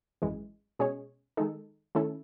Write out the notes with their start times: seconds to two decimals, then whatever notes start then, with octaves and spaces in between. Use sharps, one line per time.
0.22 G#1 F#2 E3 G#3
0.79 B2 G#3 C#4 G#4 C#5
1.37 D#3 G#3 D#4 A4
1.95 D#3 A3 C#4 E4 A4